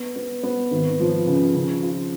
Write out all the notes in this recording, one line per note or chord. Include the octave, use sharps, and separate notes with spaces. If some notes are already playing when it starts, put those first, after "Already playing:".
Already playing: B3
B3
B3
G#1
F3
C#3
C#3
F4